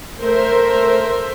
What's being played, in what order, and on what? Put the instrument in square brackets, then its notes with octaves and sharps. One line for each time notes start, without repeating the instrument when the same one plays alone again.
[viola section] A3 A#4 C5 E5